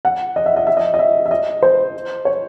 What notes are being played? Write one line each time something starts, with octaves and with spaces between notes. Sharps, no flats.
F#5
D#5
E5
D#5
E5
D#5
D#5
E5
E5
D#5
C5
C#5